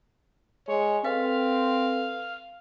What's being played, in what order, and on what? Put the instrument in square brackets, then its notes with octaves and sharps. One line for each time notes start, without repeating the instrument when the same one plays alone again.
[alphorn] G#3 [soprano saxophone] C#5
[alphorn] C4 [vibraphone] A4 B4 [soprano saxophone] F5